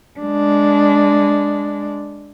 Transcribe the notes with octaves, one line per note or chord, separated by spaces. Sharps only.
G#3 D4